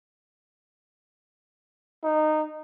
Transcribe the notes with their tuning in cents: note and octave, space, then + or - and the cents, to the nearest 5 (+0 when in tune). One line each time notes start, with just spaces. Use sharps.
D#4 -15